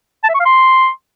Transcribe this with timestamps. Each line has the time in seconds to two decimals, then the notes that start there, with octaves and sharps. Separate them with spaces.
0.24 A5
0.29 E5
0.35 C#6
0.40 F5
0.46 C6